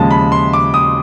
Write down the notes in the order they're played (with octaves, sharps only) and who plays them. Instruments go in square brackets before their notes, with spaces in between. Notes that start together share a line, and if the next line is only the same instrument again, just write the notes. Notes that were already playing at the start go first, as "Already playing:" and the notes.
Already playing: [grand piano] D#2 C#3 F3 G#3 A5
B5
C6
D6
D#6